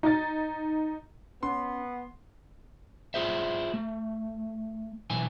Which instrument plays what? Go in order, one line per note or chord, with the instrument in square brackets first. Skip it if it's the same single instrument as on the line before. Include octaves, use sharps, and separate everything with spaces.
[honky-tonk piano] D#4 A6
[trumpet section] B3 [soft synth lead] C#4 [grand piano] C6
[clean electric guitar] E4 F4 G#4 C5 E5
A3
B1 E3 G#5